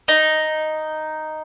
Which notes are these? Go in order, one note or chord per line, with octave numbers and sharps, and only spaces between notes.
D#4